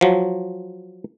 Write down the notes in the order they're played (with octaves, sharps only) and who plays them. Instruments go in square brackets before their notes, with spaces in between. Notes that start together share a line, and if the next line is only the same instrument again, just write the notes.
[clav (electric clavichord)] F3 F#3